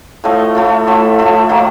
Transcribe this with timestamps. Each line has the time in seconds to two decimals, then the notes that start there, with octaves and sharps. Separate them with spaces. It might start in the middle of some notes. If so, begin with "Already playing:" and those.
0.24 A2 F3 A3 D#5
0.55 A2 F3 A3
0.87 A2 F3 A3 E5
1.18 A2 F3 A3 E5
1.49 D#3 F#3 A#3